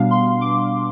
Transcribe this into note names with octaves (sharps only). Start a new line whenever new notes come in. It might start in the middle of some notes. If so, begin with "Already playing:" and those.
Already playing: B2 G3 B3 D4 F5
C6
D6